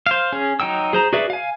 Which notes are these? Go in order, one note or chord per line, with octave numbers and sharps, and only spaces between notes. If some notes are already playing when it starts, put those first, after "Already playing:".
C5 F5
C#4 G#4
F#3 D#4 G5 E6
G#4 C5 A#5
F#4 G#4 B4 D5 E5
F5 G#5